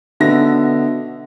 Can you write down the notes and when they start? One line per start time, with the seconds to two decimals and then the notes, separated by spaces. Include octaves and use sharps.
0.20 B2 D3 B3 E5 A#6